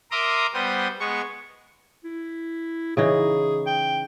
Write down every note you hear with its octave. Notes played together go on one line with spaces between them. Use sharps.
A#4 E5 A#5 C6 D6 D#6
G3 B3 C5 D#6
G#3 B3 C#6
E4
C#3 E3 D#4 G#4
G5